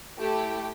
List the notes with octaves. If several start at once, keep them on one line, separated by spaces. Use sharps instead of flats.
A3 E4 G4 G5